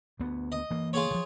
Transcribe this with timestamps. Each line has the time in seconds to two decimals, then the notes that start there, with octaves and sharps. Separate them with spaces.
0.20 D2 B3
0.52 D#5
0.71 E3 A#3
0.93 F4 G#4 C#5
1.11 D3 F3